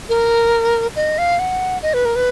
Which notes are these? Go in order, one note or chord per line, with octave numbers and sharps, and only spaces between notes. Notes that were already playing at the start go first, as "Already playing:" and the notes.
A#4
D#5
F5
F#5
D#5
B4
A#4
B4